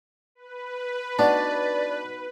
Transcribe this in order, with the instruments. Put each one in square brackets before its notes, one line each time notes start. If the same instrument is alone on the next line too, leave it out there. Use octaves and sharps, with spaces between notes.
[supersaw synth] B4
[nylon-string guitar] B3 D#4 F#4 [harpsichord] D4 [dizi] D5